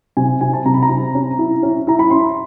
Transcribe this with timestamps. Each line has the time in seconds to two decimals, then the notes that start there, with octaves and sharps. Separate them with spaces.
0.17 C3 G#5
0.41 C3 G#5
0.53 A5
0.66 C3 A#5
0.74 B5
0.83 A#5
0.90 C3
1.15 C#4
1.38 E4
1.63 C#4
1.87 E4 A#5
1.99 B5
2.11 C#4 C6